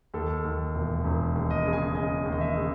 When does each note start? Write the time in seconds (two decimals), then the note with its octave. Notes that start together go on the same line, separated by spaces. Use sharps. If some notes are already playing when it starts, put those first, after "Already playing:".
0.14 D#2 A4
0.45 D#2
0.75 E1
1.05 E1
1.35 D#2
1.51 D#5
1.66 C#3
1.73 G#5
1.95 C#3 D#5
2.26 D#2
2.32 D#5
2.41 E5
2.56 C#3